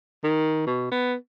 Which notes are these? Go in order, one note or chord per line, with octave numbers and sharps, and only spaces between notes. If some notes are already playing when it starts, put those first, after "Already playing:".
D#3
B2
B3